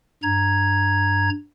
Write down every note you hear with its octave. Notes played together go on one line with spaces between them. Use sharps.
G2 A#5 G#6